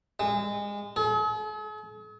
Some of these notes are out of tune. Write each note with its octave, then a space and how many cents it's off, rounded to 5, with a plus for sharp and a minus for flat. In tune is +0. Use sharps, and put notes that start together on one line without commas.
G#3 -25
G#4 +45